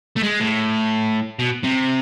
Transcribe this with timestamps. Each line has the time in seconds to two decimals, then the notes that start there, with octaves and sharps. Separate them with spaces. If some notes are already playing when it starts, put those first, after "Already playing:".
0.16 A3
0.23 G#3
0.40 A2
1.39 B2
1.64 C3